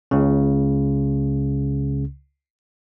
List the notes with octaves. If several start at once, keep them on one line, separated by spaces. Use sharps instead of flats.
C#2 C#3